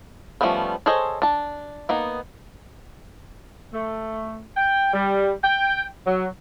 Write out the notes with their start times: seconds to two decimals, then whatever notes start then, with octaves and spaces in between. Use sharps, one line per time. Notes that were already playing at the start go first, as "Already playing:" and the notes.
0.41 F3 G3 A3 B3 C#4
0.86 G#4 A4 C5 C#5 D#5
1.22 D4 A5
1.89 A#3 B3 D#4
3.73 A3
4.56 G5
4.93 G3
5.43 G5
6.06 F#3